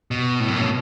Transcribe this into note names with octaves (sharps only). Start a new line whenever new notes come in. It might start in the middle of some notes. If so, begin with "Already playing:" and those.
B2
A2
F#2
A2
B2